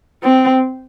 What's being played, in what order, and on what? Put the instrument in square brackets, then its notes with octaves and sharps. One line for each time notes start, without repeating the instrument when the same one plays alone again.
[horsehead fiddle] C4